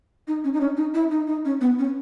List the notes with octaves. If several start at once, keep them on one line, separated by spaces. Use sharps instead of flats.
D#4
C#4
D#4
C#4
D#4
E4
D#4
D#4
C#4
B3
C#4